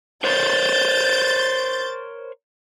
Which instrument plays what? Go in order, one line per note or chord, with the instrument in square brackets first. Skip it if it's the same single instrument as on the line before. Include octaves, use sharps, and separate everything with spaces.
[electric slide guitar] A#4 C5 C#5 [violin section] G6 A6